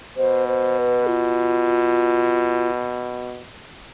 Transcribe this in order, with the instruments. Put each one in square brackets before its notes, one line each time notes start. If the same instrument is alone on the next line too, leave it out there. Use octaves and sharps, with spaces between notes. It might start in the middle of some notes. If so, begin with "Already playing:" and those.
[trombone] B2 [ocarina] C5
[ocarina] C5
B4
F4